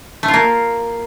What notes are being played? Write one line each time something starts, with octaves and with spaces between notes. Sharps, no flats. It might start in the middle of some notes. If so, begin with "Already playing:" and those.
A3
F4
A#3